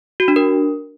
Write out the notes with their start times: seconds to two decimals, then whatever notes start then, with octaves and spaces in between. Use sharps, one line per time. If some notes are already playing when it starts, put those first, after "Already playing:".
0.20 F#4
0.28 D4
0.36 A#4